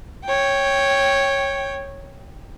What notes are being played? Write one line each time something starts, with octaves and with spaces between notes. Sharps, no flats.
C#5 G5